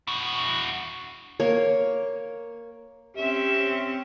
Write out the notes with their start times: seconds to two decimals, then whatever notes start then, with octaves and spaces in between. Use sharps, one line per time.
0.07 E4 F#4
1.40 A#3 C#5
3.17 C4 C#4 G4 E5